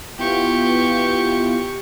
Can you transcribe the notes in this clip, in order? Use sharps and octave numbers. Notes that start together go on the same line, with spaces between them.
B3 E4 F4 G4 C#6